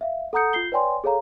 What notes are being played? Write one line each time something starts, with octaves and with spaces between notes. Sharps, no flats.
E5 F5
A4 F#5 A#5 D#6 G6 C#7
F4 G6 C7 G7
B4 C#5 D5 G5 G#5 C6
G#4 A4 C#5 F5 A#5